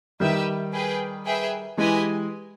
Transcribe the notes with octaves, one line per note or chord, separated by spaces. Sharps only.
D#3 G3 G4 B4 E5
G#4 B4 G5
G#4 B4 E5 G5
E3 G#3 G4 B4 D#5 G#5